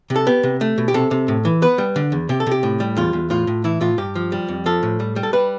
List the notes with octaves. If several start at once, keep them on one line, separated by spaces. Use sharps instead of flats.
C3
A4
B3 G4
C3
A3
B2
G4
C3 A4
C3
A2
E3
B3 B4
G3
D3
E2
C3 G4
A4
C3 G4
A2
G3
E2 F4
E2
A2 F4
A2
E3 E4
A2 F4
G2 G4
F3
G3
F2
F3 A4
A2
G3
G3
A4
G3 B4